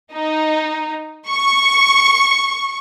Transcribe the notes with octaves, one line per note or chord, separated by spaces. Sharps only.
D#4
C#6